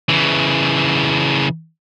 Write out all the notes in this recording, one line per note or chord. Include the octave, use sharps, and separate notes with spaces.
C#3 E3